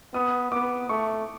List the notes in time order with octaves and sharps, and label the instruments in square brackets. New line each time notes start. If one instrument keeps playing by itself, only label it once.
[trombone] B3 [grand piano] D#6
[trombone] B3 [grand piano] D6
[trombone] A3 [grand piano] C#6